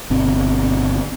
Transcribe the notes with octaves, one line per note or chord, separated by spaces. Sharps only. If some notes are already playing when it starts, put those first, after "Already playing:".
G1 B2 C4